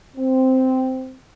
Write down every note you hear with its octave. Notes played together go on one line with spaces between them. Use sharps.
C4